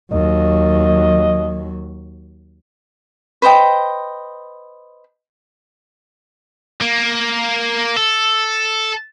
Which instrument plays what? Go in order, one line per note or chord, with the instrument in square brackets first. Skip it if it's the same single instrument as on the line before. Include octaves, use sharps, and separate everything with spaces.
[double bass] D#2 F#3 [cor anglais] D#5
[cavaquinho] B4 C5 D#5 G5
[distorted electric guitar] A#3
A4